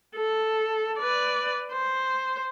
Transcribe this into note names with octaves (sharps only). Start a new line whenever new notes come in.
A4
B4 D5
C5